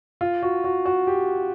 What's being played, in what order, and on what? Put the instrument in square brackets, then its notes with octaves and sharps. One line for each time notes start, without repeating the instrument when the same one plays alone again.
[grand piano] F4
F#4
F#4
F#4
G4